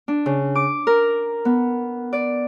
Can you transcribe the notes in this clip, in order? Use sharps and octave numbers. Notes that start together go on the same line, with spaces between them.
D4
C#3
D6
A#4
B3
D5